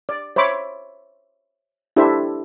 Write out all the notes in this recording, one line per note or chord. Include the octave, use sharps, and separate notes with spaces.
D5
C5 C#5 E5 B5 D6
D4 E4 G4 A4 C5 E5